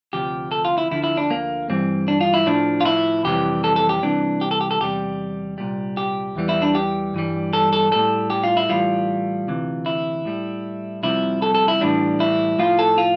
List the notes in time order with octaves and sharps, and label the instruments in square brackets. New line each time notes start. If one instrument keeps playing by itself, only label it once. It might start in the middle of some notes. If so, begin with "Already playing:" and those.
[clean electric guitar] D2 C3 F3 G4
A4
F4
E4
D2 D3 F3 E4
E4
D4
A#3
G2 E3 G3 C4
D4
F4
E4
A2 F3 D4
F4
E4
F2 C3 E3 G3 G4
A4
A4
G4
C2 C3 E3 D4
G4
A4
G4
A4
E2 C3 G3 G4
C2 A#2 G3
G4
E2 E3 G3
E4
D4
G4
G2 E3 G3
A4
A4
A2 G3 A4
G4
F4
E4
A2 E3 G3 F4
D2 C3 E3
E4
A2 G3
C2 C3 F3 E4
A4
A4
E4
A2 E3 G3 D4
E4
A2 F3 F4
A4
F4